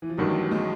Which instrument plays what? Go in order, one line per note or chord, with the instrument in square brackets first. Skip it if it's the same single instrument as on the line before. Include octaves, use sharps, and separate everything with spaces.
[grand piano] E3
F3
[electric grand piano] A1 G2 D#3 [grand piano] F#3
[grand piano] G#3